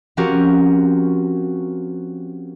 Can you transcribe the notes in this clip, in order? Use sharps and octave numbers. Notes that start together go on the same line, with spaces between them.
F3 C4 C#4 F#4 G4 A#4